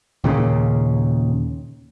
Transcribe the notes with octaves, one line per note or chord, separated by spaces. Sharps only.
D#2 A#2 C#3